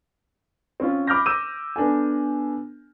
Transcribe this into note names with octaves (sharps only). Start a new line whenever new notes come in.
C4 C#4 F4
B5 D6 F6 G6 A#6
D6 E6 G6 D#7 E7
B3 D4 A4 G#5